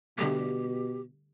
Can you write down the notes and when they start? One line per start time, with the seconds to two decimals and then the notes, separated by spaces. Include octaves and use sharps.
0.18 B2 D3 G3 A3 G4